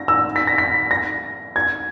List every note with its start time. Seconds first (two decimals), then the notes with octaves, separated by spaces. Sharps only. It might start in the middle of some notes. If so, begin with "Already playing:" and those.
Already playing: A#6
0.08 E6
0.36 B6
0.47 A#6
0.58 B6
0.91 A#6
1.56 G#6